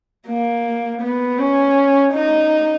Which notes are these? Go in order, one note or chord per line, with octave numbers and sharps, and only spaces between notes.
A#3
B3
C#4
D#4